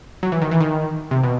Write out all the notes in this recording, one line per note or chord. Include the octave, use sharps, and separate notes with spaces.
F#3
E3
D#3
E3
D#3
C3
B2